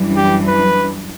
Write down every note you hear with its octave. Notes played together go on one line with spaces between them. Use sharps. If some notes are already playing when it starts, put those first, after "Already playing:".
Already playing: F#2 E3 G3 D4
G4
B4